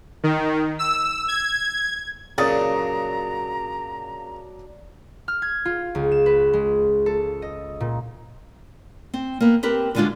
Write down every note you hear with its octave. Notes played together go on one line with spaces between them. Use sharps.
D#3
E6
G#6
A#2 C#3 F#3 D4 A#5 D#6 A6
F6
G#6
F4
C#2
E7
B4
G#3
A4
D#5
A#2
C4
A#3 B3
C4 G4 A#4 B4
D3 G3 G#3 D4 F4 F#4